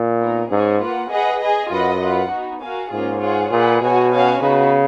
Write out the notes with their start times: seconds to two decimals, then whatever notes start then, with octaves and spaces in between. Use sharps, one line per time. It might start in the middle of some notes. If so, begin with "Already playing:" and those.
Already playing: A#2
0.21 B3 D#4 A#4
0.51 G#2 C#4 G#4 C#5 G#5
0.81 A#3 F4 B4 F#5
1.11 G#4 B4 D#5 F#5
1.41 G#4 D#5 G#5
1.71 F#2 F4 B4 D#5 F#5
2.01 F4 B4 F#5
2.31 B3 D#4 F#4
2.61 F#4 A#4 F5 G#5
2.91 G#2 A#3 C#4 F4 G#4
3.21 F4 G#4 C#5 F#5
3.51 A#2 F4 G#4 B4 F#5
3.81 B2 F#4 C#5 G#5
4.12 C#4 F#4 C#5 F5 G#5
4.42 C#3 B3 D#4 F#4 B4